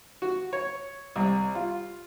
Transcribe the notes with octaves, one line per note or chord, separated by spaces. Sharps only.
F#4
C#5
C2
F4